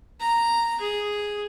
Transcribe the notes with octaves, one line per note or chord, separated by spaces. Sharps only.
A#5
G#4